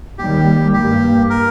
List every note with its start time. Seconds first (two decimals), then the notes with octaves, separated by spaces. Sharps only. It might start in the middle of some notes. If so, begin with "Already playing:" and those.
0.18 D#2 D#3 G3 G4
0.73 G2 G3 A#3 G4
1.30 A#4